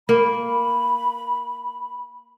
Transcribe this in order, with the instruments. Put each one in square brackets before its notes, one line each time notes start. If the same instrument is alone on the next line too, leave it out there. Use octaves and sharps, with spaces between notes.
[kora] A#3 [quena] B5